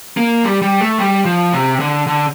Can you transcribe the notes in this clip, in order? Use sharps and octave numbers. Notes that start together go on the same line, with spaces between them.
A#3
G3
G3
A3
G3
F3
C3
D3
D3